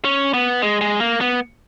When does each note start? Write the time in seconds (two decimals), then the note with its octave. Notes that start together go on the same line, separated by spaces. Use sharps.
0.05 C#4
0.34 B3
0.62 G#3
0.81 G#3
1.00 A#3
1.21 B3